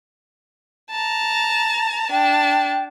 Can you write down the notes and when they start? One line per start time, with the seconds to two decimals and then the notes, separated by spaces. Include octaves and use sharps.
0.91 A5 A#5
2.11 D4 G5 A5